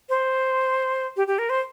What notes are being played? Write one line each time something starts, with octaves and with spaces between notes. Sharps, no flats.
C5
G4
G4
A#4
C5